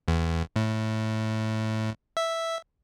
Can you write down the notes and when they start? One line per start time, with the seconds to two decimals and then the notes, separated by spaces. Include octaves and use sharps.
0.08 E2
0.56 A2
2.17 E5